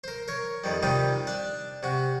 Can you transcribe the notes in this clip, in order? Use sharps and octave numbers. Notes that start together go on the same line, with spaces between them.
A#4 C5
A#4 C#5
F2 D#3 F3 G3
C3 D#3 G3 D#4 F4 G4
D4 D5
C3 F#4